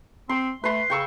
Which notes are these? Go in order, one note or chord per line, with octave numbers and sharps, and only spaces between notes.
C4 C6
A3 B4 C6
C#3 G5 C#6 E6